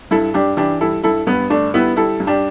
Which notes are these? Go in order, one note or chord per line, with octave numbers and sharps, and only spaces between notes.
G2 E4 A4
G2 D4 G4
E3 D4 G4
G3 E4 A4
G2 E4 A4
G2 B3
D3 A3 D4
G3 B3 E4
G3 E4 A4
G2
D4 G4